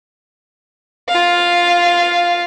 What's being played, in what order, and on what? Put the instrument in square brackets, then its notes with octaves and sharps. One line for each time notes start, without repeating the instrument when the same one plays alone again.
[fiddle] F4 F5